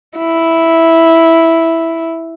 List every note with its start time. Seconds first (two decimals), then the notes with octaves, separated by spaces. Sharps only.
0.18 E4